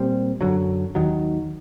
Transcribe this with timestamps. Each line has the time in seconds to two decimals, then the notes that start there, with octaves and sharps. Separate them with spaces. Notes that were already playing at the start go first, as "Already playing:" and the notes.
Already playing: A#2 G3 C4
0.41 F#2 D3 F#3
0.95 D#2 D#3 F#3